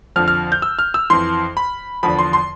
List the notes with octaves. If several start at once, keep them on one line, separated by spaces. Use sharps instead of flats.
F2 D3 F3 F6
F6
G6
E6
F6
E6
F2 E3 C6
B5
E2 D3 F3 B5
C6
C6